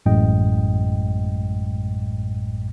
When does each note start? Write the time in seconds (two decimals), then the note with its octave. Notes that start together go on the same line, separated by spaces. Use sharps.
0.06 A1 F#2 A2 G#3 D#5 G5